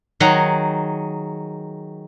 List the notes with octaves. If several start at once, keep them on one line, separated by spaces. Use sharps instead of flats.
D#3 F#3 G#4 F#5 A#5